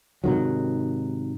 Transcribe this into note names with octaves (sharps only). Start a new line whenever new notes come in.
G#2 C3 D#3 F#3